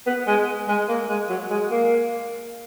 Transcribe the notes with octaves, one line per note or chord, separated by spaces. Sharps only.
B3
G#3
G#3
A#3
G#3
F#3
G#3
A#3